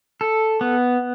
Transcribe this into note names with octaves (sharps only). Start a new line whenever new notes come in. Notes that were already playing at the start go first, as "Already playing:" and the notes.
A4
B3